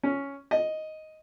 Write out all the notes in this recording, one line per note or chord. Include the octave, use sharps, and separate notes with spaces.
C#4
D#5